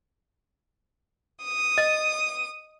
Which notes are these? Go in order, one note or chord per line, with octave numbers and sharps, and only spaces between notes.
D#6
D#5